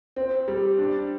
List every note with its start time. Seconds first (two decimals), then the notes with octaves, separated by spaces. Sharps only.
0.16 C4
0.48 G3
0.78 D4